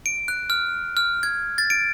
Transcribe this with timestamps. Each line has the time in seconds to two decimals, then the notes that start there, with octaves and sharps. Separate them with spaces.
0.06 D7
0.28 F#6
0.50 F6
0.97 F6
1.23 G#6
1.58 A6
1.70 D7